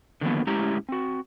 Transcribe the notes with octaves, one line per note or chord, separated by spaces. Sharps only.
D3 D#3 F3 F#3 A#3 B3
A2 G#3 C#4 E4 G4 A#5
C4 F#4